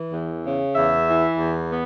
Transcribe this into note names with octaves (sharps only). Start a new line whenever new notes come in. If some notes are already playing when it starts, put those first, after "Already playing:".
Already playing: E3
E2
C#3
E2 E5
E3
E2
B3